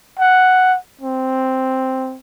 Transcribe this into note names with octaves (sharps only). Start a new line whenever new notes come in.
F#5
C4